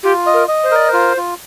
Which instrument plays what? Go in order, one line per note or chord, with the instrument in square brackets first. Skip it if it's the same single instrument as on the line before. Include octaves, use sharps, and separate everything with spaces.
[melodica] F4 [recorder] G4
[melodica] D#5
[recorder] A#4
[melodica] D#5
[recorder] C5
[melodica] A#4 [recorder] D5
[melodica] F4 [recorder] C5
[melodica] F4